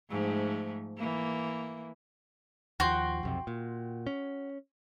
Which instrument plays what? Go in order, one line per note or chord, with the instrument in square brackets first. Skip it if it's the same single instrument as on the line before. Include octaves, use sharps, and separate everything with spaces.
[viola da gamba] G#2 F3 A3
E3 A#3
[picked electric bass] D#2 F3 [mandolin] F#4 G5 C6
[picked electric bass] B1 F2 C3
A#2
C#4